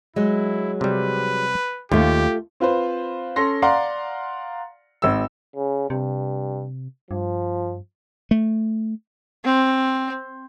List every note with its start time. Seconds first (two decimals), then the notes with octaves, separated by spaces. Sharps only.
0.16 F#3 G#3 E4
0.81 C3 G3 B4
1.92 D#2 A3 F4 G4
2.60 C4 F4 B4 C5
3.36 C#4 A4 C6 A#6
3.62 D5 F5 F#5 A#5 C6
5.02 G#1 E6
5.56 C#3
5.90 G2 C3
7.11 G2 F3
8.31 A3
9.44 C4